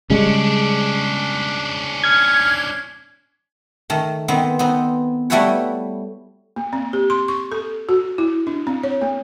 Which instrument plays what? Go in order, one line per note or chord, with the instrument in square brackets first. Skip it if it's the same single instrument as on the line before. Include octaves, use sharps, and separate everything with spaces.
[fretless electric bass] C#3 G3 G#3 [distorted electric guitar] C#4 D4
[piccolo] F6 [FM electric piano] G#6
[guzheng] D#3 A3
D#3 B3 C4
B3 C4 D#4
G3 A3 E4 F#4 B4 C#5
[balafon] A#3
C4
G4
C6
C#6
A4
F#4
E4
D4
C4
C#5
A#3